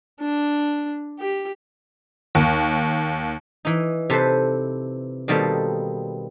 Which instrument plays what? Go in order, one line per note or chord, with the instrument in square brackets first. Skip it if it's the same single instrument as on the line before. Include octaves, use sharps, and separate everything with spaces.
[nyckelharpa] D4
G4
[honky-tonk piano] D#2
[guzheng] E3 D#4
C3 A4 B4 C5
B2 D#3 G3 A#3 C4 A4